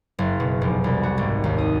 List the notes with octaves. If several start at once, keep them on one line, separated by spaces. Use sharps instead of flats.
F#1
B2
F1
C2
F#4
G#1
D#2
D#6